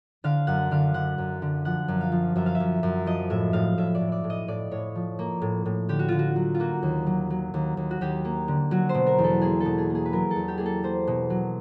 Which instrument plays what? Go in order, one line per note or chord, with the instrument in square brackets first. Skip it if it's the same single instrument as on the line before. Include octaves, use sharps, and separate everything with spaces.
[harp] D3 F5
F#2 F#5
D3 F5
D3 F#5
F#2
D3
F3 F#5
F#2
F5
F3
F#2 E5
F5
E5
F#2
F#2
F3 D#5
A2 E5
A2 F5
A2 E5
D5
A2
D5
A2
D#5
A2 D5
A2 C#5
F3
A#3
A2
A2
D3 G4
F#4
D3 F4
F#4
F#3
F4
A#3 F#4
D#2
F#3
F#3
D#2
D#2
F#4
D#2 G4
A#3
D3
F#3 F#4
C5
B2
A#4
E2
A4
A#3 G#4
A4
B2
G#4
A#3
G#4
B4
F#3 A#4
E2 A4
G4
A#3 G#4
A4
A#3 C5
B2
F#3